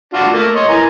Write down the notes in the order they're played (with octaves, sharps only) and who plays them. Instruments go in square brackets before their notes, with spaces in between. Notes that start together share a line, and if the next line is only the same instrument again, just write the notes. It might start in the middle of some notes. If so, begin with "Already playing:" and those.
[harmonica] D4 F4 F#4
A3 A#3
C#5 D#5 C6
E3 A#4 G#5